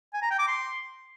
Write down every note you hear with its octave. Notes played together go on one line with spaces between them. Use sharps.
G#5
A#5
G5
D6
C6